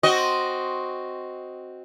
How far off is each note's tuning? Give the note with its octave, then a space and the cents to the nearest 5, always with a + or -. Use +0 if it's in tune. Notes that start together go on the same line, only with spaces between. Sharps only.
C4 +0 F#4 +0 D#5 +0